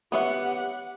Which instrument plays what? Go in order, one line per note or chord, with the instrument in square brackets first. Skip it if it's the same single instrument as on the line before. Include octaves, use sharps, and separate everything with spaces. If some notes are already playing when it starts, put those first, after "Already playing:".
[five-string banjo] B3 C#5 E5 [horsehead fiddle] G4 F#5